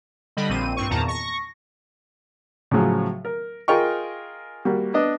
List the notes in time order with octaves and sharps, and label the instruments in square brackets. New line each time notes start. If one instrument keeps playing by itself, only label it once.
[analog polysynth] D3 G3 D#5 B5
A#1 A#2 C4 D#7
G2 C4 C#6
E2 A#2 D#3 A5 A#5
C#6 A#6
[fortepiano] A2 C#3 F3 F#3 G#4
A#4
F4 G#4 A#4 D#5 G5 C#6
G3 A#3 F#4
B3 D4 D#5